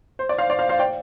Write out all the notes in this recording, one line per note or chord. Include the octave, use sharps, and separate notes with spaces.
C5
D5
C5 F5
D5
C5 F5
C5 F5
D5 G5